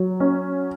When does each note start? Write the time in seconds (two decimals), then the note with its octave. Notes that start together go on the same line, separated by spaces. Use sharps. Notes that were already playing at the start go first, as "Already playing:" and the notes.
Already playing: F#3
0.20 C#4